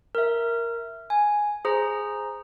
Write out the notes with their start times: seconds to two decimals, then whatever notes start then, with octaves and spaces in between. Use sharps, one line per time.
0.15 A#4 E5
1.10 G#5
1.65 G#4 C5 A#5